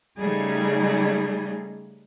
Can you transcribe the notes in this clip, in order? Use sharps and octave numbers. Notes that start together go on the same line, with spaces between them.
C#3 G3 A3 D#4 G#4